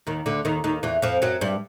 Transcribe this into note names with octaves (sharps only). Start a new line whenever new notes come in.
D#2 D#3
D2 D3
D#2 D#3
D#2 D#3
E2 E3
F2 F3
F#2 F#3
G2 G3